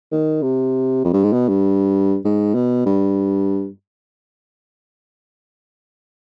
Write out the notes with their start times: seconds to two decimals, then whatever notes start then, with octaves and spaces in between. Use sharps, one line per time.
0.12 D#3
0.42 C3
1.05 F2
1.13 G2
1.23 G#2
1.33 B2
1.49 G2
2.25 G#2
2.55 B2
2.86 G2